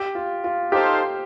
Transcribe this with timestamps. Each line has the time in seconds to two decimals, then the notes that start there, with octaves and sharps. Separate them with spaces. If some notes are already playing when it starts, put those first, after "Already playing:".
Already playing: G4
0.15 F4
0.44 F4
0.71 D#4 G4 A4 C5 F5